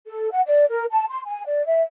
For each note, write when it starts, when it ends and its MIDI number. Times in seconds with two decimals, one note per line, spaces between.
0.06 0.30 69
0.31 0.41 78
0.46 0.64 74
0.70 0.84 70
0.91 1.04 81
1.09 1.21 84
1.27 1.43 80
1.46 1.65 74
1.66 1.81 76